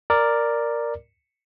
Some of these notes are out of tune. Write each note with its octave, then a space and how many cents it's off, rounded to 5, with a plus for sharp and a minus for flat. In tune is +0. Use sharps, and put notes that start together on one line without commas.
A#4 +0 D5 +5